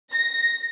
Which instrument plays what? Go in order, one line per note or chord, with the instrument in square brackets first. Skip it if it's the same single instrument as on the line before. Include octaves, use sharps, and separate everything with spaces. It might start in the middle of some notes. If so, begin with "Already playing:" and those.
[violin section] A#6